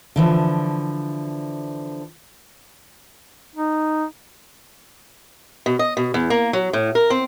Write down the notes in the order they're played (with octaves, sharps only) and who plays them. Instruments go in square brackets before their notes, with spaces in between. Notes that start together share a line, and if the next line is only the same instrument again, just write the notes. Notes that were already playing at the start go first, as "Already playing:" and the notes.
[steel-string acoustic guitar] D3 E3 F3
[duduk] D#4
[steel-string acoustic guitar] B2
D#5
B2
E2
A#3
F#3
A2
A#4
C4